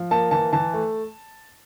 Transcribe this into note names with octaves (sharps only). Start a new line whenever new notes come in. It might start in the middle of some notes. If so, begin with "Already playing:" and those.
Already playing: F3
A#3 A5
E3 A5
E3 A5
A3